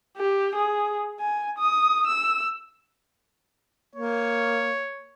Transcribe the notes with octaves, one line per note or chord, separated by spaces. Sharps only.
G4
G#4
G#5
D#6
E6
A#3 C#5